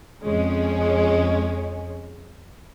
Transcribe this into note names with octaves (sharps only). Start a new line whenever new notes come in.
F2 G#3 C#4